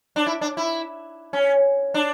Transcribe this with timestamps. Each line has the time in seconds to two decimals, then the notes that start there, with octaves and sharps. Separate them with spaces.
0.16 D4
0.27 E4
0.41 D4
0.57 E4
1.33 C#4
1.94 D4